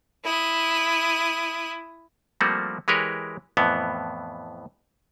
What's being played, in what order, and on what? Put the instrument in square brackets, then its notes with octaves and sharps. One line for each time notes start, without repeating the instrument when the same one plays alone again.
[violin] E4 D#6
[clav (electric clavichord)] F3 G3 A3 A#3 C4 F#4
E3 G#3 G4 A#4 B4 C#5
F2 A2 E3 B3